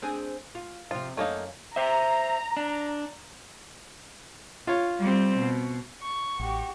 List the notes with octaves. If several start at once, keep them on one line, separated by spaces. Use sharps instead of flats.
C4 D4 G#4
F4
C3 F3 F4
F#2 A3 A#3 D#4 F5
C5 E5 A#5
D4
F4 C#5
G3 C4
B2
C#6
A1 F#4 G4